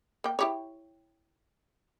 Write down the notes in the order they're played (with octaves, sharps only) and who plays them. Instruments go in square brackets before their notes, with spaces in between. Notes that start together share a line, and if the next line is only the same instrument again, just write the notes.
[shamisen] A#3 G5
E4 G4 C#5